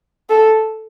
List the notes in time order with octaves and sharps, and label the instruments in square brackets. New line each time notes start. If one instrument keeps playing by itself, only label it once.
[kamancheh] A4